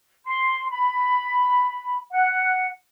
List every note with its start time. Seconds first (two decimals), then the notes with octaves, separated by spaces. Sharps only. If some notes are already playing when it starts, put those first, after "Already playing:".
0.25 C6
0.70 B5
2.10 F#5